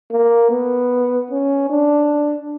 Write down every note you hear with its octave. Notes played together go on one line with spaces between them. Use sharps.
A#3
B3
C#4
D4